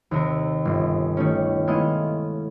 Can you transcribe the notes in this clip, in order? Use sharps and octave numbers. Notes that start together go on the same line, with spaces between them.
D#2 C3 A#4
G1
D#3 A3 C#4
G#3 A3 B3 E4 D#5 F5